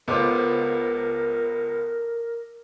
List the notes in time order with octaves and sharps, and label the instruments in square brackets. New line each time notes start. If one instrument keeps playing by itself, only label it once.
[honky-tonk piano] C#2 C5 [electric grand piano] B3 F4 [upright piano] A4 D#5 D6 [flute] A#4